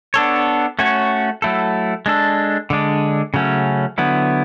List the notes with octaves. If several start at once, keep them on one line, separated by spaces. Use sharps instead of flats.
B3 D4 A4 C#5
A3 C#4 F#4 C#5
F#3 A3 E4 A4
G#3 D4 A4
D3 G#3 D4
C#3 F#3 A3 C#4
D3 F#3 B3 E4